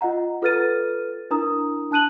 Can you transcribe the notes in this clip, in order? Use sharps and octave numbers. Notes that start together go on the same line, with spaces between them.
F4 D#5 F#5 A#5
F4 A4 B4 F6 A6 D#7
D4 E4 A#4 A#5 D#6
D4 A5 F#6 D#7 F#7